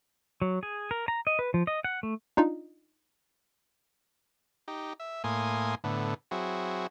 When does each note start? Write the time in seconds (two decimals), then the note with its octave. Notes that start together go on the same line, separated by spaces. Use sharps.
0.42 F#3
0.63 G#4
0.91 A#4
1.08 A#5
1.27 D#5
1.39 B4
1.54 F3
1.67 D#5
1.84 F#5
2.03 A3
2.37 D4 D#4 F4
4.68 D#4 G4
5.00 E5
5.24 A2 A#3 G#5 C6 D#6
5.84 A2 D3 B3
6.31 F#3 C4 E4 F#4 G#4